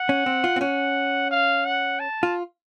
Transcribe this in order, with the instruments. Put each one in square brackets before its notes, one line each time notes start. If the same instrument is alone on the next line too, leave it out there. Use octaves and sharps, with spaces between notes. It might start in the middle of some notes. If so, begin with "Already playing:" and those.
Already playing: [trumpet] F#5
[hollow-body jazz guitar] C#4
C4
F4
C4
[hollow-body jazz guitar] C#4 [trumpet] F#5
[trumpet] F5
F#5
A5
[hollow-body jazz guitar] F4